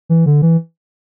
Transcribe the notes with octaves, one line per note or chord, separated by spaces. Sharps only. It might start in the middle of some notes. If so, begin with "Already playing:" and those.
E3
D3
E3